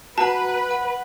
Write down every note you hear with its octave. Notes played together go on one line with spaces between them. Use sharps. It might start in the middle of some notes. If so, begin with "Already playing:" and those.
F#4 B4 F#5 A5 A#5
F#5